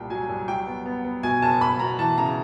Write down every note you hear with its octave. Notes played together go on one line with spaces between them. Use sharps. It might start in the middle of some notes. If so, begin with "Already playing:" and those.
Already playing: C2 A#2 G5
F#3 G#5
C2
F#3 G5
B3
B3
B3
B2 G#5
F#1 A5
F#1 B5
B2 A#5
E3 A5
C#3 A#5